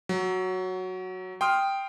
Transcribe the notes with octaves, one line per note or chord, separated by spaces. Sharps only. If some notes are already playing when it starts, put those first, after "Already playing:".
F#3
G5 C6 D#6 F6